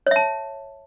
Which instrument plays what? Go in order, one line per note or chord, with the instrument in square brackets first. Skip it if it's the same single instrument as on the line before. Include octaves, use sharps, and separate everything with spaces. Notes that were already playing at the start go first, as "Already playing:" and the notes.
[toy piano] C#5
E5
A5